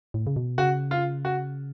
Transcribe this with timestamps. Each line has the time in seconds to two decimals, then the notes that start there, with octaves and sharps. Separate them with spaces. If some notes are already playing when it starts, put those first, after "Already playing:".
0.14 A2
0.27 C#3
0.36 B2
0.58 C#3 F#4
0.91 F4
1.25 F#4